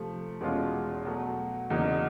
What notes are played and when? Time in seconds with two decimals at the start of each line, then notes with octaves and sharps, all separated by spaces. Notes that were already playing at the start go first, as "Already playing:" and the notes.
Already playing: C3 F3 A3
0.41 E2 B2 G#3 C#4 F4
1.05 B2 F#3 A3
1.70 E2 C#3 F#3 A#3 D#4